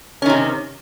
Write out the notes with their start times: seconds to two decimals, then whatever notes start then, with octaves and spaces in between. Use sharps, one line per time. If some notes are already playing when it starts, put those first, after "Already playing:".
0.22 C#4
0.26 D#3
0.29 C3